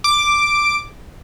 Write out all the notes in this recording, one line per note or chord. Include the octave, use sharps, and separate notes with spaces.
D6